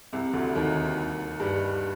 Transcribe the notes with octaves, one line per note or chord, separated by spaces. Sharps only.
C2 C3
D2 D3
D#2 D#3
G2 G3